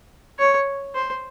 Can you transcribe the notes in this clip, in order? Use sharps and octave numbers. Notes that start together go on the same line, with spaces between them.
C#5
C5